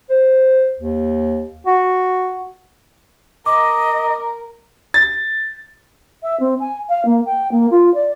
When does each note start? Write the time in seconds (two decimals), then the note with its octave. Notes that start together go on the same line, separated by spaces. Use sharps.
0.10 C5
0.80 D#2
1.67 F#4
3.46 A#4 D#5 D6
4.94 A6
6.23 E5
6.40 C4
6.60 G#5
6.89 F5
7.05 A#3
7.26 G5
7.52 A#3
7.71 F4
7.94 D5